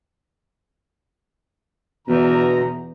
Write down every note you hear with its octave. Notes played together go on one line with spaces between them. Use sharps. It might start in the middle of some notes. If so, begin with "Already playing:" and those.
E2 B2 D3 A#5